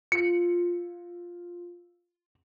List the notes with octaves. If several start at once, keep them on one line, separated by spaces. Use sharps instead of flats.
F4 C#7